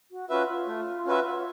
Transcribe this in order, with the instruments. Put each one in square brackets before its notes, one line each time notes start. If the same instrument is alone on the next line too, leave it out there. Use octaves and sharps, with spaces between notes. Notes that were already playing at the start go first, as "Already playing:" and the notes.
[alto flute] F#4
[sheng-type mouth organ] C#4 F#4 B4 E5 [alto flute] F4
[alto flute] F4
[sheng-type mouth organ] A3
C#4 F#4 B4 E5